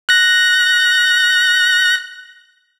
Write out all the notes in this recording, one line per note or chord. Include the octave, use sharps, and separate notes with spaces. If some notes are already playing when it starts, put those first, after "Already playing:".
F#6 A#6